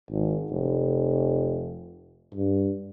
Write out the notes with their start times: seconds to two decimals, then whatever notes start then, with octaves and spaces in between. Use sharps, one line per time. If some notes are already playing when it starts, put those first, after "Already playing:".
0.11 G#1
0.50 F1
2.34 G2